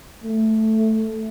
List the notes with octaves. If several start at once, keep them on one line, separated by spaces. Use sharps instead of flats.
A3